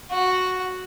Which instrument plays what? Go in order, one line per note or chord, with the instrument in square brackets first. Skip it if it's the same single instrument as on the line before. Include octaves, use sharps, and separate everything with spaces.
[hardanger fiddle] F#4